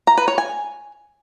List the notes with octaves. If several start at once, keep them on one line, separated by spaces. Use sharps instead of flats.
A#5
B4
C#5
G#5